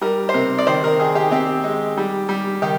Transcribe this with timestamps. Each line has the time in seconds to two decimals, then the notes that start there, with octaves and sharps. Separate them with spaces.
0.01 G3 A#4
0.29 C5
0.34 C3 A#4
0.58 D5
0.67 D#3 C5
0.84 A#4
0.99 D#3 G#4
1.15 G4
1.31 C4 G4
1.64 G#3
1.97 G3
2.29 G3
2.62 D#3 G4